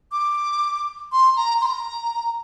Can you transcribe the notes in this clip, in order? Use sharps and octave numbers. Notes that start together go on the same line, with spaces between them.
D6
C6
A#5
C6
A#5